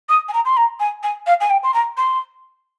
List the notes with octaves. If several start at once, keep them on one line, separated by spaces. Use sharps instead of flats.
D#6
G#5
A#5
C6
A#5
G#5
G#5
F5
G#5
G5
C6
A#5
C6